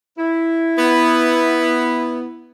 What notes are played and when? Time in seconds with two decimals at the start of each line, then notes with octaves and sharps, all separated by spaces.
0.18 E4
0.79 B3